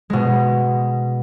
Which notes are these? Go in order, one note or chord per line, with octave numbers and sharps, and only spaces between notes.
B2 G#3